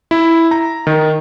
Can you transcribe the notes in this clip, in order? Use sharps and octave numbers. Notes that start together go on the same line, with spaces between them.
E4
A#5
D#3